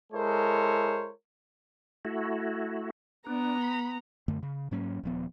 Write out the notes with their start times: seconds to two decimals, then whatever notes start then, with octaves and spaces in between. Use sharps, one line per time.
0.13 G#3 E4 A4 A#4 C5 C#5
2.05 A3 E4 F#4
3.27 B3 D4 A#5
3.61 B5
4.28 F#2 D3 A3
4.43 C#3
4.71 G#2 F#3 A#3 C#4
5.03 D#1 F3 B3